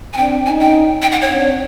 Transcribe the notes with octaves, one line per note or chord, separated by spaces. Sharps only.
G#5
C4 D4 G5
C#4 D#4 G#5
G5
G5
F#5
C#5
C4 D4